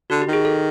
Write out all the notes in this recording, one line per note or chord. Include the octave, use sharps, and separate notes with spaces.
D3 F#4
G4
D#3
G#4
A4